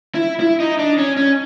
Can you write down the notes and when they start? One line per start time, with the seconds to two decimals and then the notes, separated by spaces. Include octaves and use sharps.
0.15 E4
0.40 E4
0.60 D#4
0.79 D4
0.98 C#4
1.17 C#4